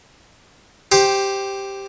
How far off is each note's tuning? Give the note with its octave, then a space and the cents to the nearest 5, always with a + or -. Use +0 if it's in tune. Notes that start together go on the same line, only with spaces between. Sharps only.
G4 +0 C5 +10